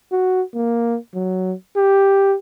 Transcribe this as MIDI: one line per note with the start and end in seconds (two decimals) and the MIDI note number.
0.12 0.42 66
0.54 0.97 58
1.15 1.54 54
1.77 2.36 67